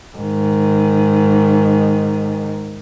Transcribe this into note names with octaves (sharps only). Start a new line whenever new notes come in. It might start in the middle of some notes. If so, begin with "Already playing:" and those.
G#2 D#3